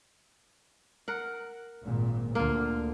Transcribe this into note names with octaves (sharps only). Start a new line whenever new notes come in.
A#4 F#5
G#1 A#2
D2 D3 A#3 F4